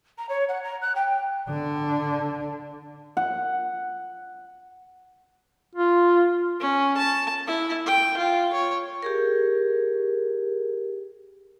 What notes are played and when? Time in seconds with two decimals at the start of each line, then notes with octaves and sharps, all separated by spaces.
0.18 A#5
0.29 C#5
0.49 F#5
0.64 A#5
0.82 F#6
0.95 G5
1.49 D3 D4
3.17 F#5
5.75 F4
6.60 C#4
6.97 A5
7.47 E4
7.86 G5
8.17 F4
8.53 C#5
9.02 G4 G#4 A#4